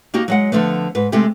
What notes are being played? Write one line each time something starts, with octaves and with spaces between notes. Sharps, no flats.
A#3 D#4 F#4 G4
F#3 G#3 F#5
D3 F3 A3 B3
G#2 B4
C3 G#3 A3 G4